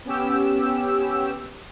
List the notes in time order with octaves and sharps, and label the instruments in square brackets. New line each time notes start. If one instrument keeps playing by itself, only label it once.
[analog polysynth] B3 C#4 G4 E6